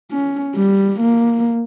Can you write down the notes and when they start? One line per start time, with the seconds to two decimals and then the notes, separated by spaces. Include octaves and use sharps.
0.12 C#4
0.55 G3
1.00 A#3